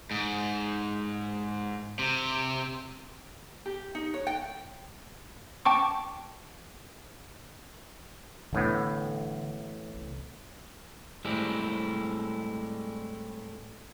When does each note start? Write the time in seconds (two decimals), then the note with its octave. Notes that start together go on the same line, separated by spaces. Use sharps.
0.11 G#2
1.99 C3
3.66 G4
3.95 D#4
4.14 C#5
4.27 G5
5.65 G5 A5 C#6 D6
8.53 A1 A2 D3 G3 B3
9.94 C2 C#3
11.25 A2 G3 G#3 C4 E4